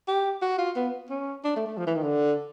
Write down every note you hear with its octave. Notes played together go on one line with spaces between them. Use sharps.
G4
F#4
F4
B3
C#4
D4
A3
A3
F3
E3
D#3
D3